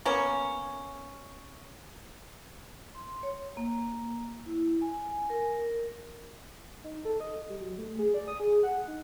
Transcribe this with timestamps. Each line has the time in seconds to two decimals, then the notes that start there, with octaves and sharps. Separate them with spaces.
0.05 A#3 B3 C#4
2.95 C6
3.23 C#5
3.57 A#3
4.46 E4
4.82 G#5
5.30 A#4
6.84 D#4
7.05 A4
7.20 D#5
7.49 G3
7.61 F#3
7.78 A3
7.99 G#4
8.14 D5
8.28 D#6
8.40 G#4
8.63 F#5
8.88 D#4